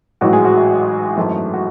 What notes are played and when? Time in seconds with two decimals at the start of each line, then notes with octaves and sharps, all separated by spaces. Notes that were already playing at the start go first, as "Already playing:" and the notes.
0.21 A1 G#2 E3 F#3 F#4
0.33 G#3 G#4
0.45 F#3 F#4
0.57 E4
1.17 G#1 F#2 E3 A3
1.54 F#4